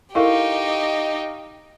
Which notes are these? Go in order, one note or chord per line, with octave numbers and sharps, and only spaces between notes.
D#4 E4 G4 A4 A#4 D#5 F5 C#6